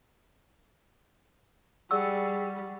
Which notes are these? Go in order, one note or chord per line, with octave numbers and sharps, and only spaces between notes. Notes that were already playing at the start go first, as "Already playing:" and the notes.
G3 G#4 D5 F#5 C#6 E6